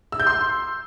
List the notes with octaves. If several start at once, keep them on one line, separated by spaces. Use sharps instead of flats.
E6
G6
C6